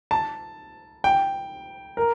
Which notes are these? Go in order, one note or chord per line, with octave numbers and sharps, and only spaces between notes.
A5
G5
A#4